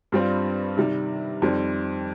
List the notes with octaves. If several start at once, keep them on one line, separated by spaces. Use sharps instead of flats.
G2 G3 C4 F4
C3 D#3 G3
F2 D#3 G3 C4